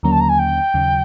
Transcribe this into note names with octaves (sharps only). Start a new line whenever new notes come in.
D#2 D3 F#3 A#3 C#4 A#5
A5
A#5
G#5
G5
D#2 C#3 F#3